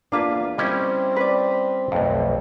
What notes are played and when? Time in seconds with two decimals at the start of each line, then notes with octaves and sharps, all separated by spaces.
0.12 E2 A#3 D4 F4 B4
0.58 G3 C4 C#4 E4 D#5
1.16 B4 D5
1.92 B1 F2 A3